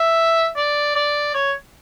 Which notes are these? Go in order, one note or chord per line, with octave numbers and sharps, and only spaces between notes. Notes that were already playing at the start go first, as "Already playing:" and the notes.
Already playing: E5
D5
D5
C#5